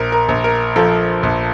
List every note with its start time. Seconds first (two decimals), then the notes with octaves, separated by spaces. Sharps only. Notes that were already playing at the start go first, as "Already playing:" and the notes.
Already playing: A#1 A#4
0.12 A#4
0.28 A#1
0.44 A#4
0.76 F3 A4
1.23 A#1